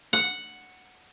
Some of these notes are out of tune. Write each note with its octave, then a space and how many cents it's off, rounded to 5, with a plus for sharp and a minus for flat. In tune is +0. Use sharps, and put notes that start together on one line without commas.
F#5 +0